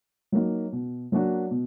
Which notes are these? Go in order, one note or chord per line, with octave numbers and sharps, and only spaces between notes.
F#3 A#3 D#4
B2
F#3 A#3 D4 F#4
B2